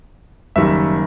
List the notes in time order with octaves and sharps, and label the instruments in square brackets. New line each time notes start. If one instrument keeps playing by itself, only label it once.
[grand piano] F#1 D#3 [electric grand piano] G3 E5